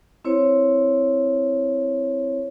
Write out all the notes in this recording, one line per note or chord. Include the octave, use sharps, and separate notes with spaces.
C4 E4 C5 C#5